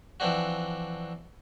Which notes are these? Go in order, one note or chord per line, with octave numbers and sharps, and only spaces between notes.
E3 F3 C4 D4 F#4